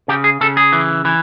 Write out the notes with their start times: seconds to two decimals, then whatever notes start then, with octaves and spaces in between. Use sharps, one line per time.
0.08 C#3 G4
0.24 G#4
0.41 C#3 A4
0.57 G#4
0.72 E3
1.05 E3